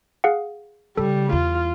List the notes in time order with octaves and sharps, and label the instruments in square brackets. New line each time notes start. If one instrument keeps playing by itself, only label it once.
[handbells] G#4 F5 F#5
[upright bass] C#3 [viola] G3 [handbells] A4
[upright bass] E2 [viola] F4